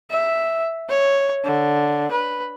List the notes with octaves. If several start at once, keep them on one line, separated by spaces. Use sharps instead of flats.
E5
C#5
D3
B4